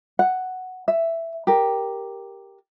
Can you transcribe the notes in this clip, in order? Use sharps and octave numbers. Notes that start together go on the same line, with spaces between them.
F#5
E5
G4 A#4